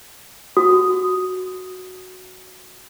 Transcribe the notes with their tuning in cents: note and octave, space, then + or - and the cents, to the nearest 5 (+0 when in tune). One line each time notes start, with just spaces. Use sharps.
F#4 +0 D#6 +0